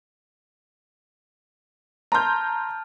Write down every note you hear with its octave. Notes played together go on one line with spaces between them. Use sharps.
A5 A#5 C6 F6 G6